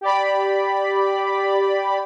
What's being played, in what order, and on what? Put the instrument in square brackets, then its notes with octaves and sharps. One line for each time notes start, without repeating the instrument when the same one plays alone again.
[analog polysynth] G4 D5 B5